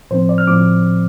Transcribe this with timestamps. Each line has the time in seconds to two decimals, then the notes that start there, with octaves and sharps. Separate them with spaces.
0.11 A2 F3 C4 C5
0.29 D5
0.38 F6
0.47 A2 F3 C4 D6